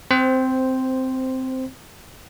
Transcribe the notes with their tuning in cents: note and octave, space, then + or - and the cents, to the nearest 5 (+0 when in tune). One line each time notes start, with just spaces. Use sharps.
C4 -10 C5 +0